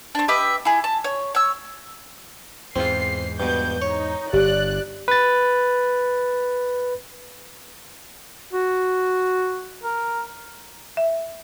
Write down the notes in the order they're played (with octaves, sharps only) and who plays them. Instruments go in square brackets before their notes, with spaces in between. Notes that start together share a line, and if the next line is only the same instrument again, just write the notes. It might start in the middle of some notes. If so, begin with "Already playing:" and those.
[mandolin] C4 D4
G4 B4 D#5 E5
E4 G#4
A5
C#5
C#5 E6
[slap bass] E2 G#2 [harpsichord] C4 F4 [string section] C7
[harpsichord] G2 B2 [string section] G6
[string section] D#4 [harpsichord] C#5
[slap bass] G1 [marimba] G4 [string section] D5 F#6
[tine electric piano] B4 A6
[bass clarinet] F#4
A#4
[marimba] E5